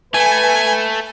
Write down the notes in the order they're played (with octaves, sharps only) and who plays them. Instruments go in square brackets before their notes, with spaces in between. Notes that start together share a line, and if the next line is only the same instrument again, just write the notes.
[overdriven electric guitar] A3 [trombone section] B4 [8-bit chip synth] G#5